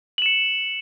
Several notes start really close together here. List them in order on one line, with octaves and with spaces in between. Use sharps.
F#7 E7 C#7